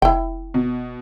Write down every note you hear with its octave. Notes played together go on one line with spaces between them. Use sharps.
F1 E4 G5
B2